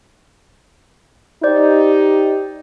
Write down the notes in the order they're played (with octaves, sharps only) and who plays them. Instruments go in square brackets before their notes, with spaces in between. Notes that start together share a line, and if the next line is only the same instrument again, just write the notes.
[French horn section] D#4 G4 [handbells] C5 D5 G6